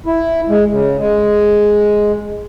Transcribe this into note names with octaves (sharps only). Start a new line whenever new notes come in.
E4
G#3
C#3
G#3